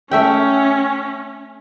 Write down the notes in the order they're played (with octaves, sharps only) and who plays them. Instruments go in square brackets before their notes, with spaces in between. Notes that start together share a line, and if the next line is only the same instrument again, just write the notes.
[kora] A3 E5 G5 [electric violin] C#4